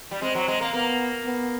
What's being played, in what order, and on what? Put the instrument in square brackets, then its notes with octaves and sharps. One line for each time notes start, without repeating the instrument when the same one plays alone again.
[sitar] G3
[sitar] G#3 [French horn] C4
[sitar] F#3
G#3
A#3
[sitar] A#3 [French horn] B3
[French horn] B3